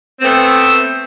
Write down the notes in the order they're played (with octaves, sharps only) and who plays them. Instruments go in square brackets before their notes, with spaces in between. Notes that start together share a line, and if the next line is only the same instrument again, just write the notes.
[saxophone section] A3 B3 C4